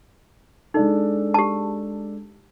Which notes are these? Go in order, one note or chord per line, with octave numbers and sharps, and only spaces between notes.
G#3 D4 D#4 A4
G4 A5